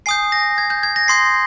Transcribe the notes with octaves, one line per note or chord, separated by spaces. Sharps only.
G#5 D#6 G6 C7
A#6
G#6
G6
G#6
A#6
C6 D#6 G6 C7